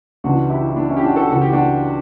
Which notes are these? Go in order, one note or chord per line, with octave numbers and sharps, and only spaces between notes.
C#2 C#3 E3 D4 F#4
E4 G4
E4
D4
C#4 E4
G4
D4 F#4
F#4 A4
C#2 C#3 E3 F#4
G4
D4 F#4